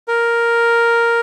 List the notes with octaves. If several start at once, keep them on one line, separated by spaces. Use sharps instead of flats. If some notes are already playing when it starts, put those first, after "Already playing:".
A#4